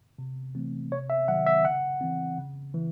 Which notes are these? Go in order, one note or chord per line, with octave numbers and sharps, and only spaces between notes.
C3
E3 A3 C4
C3 C#5
E5
D#3 F#3 F#5
E5
C#3 F#5
E3 C4
C#3
E3